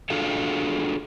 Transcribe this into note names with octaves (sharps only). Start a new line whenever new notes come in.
D4 F4 F#4 G#4 A4 F5